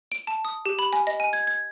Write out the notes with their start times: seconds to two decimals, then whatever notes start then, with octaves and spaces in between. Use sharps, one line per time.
0.12 D7
0.27 A5
0.45 D#6
0.66 G4
0.79 B5
0.93 G#5
1.07 D#5
1.20 G#5
1.33 G#6
1.47 G#6